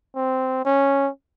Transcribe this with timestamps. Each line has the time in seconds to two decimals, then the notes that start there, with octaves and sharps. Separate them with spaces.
0.16 C4
0.65 C#4